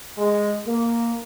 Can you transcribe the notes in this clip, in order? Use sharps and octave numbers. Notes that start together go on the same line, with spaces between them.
G#3
A#3